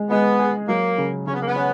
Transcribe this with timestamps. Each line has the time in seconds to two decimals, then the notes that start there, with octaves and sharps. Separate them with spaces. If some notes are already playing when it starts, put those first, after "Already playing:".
Already playing: G#3
0.10 G#3 B3
0.39 G#4
0.68 F#3 A#3
0.98 C#3
1.27 C#3 C#4
1.34 B3
1.41 A#3
1.47 B3
1.56 C#4